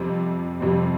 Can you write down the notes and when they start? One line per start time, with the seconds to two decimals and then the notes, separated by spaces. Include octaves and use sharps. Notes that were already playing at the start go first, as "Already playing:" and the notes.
Already playing: F2 C3 G3 C4
0.60 F2 C3 G3 C4